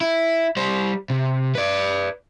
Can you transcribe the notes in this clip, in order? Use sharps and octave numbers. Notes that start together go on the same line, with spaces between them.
E4
G3 C5
C3
B4 D5